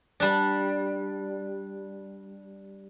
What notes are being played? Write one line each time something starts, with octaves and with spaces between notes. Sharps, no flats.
G3 D4